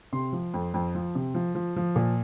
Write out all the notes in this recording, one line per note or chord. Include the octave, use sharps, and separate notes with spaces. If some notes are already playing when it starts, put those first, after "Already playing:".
C3 C6
F3
F2
F2
F3
C3
F3
F3
F3
A#2